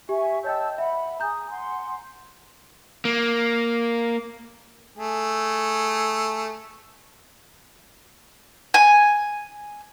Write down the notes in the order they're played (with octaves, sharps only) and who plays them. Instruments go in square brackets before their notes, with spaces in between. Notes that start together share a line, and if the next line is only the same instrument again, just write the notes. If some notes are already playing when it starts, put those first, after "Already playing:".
[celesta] G4 [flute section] E5 G#5 C#6
[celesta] C#5 D#5 G5 [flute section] A5 E6 G6
[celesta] E5 [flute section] F#5 B5
[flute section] G#4 G#5 D#6 [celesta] A#5 G6
[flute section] F#5 G#5 C6
[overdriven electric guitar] A#3
[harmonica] A3 G#4
[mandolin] G#5